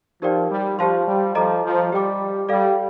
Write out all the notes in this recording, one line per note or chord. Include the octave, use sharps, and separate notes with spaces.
F3 D#4 G4 A#4 D5 G5
G3
F3 G4 C5 F5 A5 C6
G3
F3 A4 D#5 A#5 D6
F3
G3 G4 D5 G5 D6
G3 A4 D5 F5